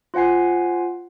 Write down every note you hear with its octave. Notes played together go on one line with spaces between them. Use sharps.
F4 C5 F#5 G#5 C7